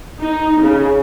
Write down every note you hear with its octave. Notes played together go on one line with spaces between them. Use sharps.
D#4
C#3